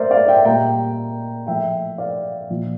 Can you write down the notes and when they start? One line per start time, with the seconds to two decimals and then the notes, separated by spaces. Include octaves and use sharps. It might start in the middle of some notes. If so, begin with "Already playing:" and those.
Already playing: A#4 C5 D5 E5
0.11 D5 F5
0.28 E5 G5
0.45 A#2 G3 G5 A#5
1.47 A2 F3 E5 G5
1.98 D5 F5
2.50 A#2 F3